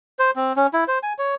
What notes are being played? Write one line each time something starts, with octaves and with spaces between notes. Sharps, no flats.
C5
C4
C#4
E4
C5
G#5
C#5